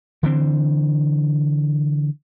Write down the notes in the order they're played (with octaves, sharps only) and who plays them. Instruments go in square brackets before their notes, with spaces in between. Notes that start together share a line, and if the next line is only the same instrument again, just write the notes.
[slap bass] D3 E3 C4